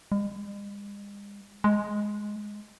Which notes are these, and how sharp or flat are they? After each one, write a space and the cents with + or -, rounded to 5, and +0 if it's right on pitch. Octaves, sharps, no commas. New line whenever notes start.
G#3 -45
G#3 +5